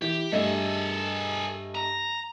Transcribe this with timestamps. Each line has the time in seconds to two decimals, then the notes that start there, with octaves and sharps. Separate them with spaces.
0.02 E3 G4
0.32 G2 A3 G#4 A4 D#5
1.75 A#5